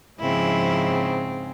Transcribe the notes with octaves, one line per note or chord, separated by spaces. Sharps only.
G#2 C#3 F3 C4 E4